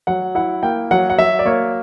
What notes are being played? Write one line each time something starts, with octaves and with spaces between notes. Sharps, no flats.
F#3 F#5
E4 F#5
A#3 G5
F#3 F#5
F#5
F#3 E5
D5
A#3 C#5